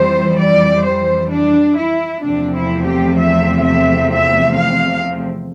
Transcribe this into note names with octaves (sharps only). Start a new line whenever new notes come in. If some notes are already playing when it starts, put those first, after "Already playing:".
Already playing: F2 E3 G3 C5
D5
C5
D4
E4
E2 C3 F3 A3 C4 D4
E4
G4
E5
E5
E5
F5